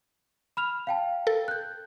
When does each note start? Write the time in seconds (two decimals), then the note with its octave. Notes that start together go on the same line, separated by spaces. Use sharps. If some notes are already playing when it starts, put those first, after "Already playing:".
0.57 B5 F6 F7
0.87 F5 G5 A5
1.27 A4
1.48 F#6 G6